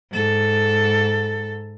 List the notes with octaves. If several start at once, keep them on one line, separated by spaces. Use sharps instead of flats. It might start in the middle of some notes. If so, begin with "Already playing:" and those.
G#2 A4